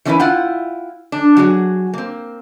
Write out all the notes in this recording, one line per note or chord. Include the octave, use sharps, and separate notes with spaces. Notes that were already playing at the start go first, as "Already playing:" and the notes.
E3 A3 C#4 E4 A#4 B4
E4 F4 F#5 G5
D4
F#3 F#4 G#4
A#3 C4